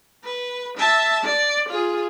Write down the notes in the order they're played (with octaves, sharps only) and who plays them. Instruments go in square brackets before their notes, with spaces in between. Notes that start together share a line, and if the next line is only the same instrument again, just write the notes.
[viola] B4
E5 A5
D5
F4 G#4